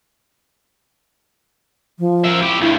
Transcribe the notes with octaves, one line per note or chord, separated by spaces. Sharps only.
F3
A#4 E5
E4 G4
D2 G2 E4